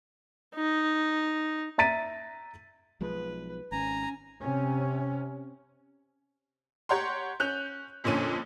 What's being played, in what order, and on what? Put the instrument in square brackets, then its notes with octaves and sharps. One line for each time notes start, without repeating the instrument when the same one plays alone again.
[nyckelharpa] D#4
[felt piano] E5 A#5 A6 B6 D#7
[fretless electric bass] B1 F3 G#3 [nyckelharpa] B4
[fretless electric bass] G#1 [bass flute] C#4 [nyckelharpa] G#5 [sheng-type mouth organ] A#5
[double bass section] C3 C#4
[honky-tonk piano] G4 C#5 F#5 A#5 C6
C#4 F#6 G6 F7
F2 A#2 D3 C#4 D#7